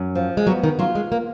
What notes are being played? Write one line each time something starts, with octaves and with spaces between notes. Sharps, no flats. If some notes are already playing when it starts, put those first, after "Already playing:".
Already playing: F#2
F3
G#3
F#3 B3
D#3
F#3 F4
G#3
A#3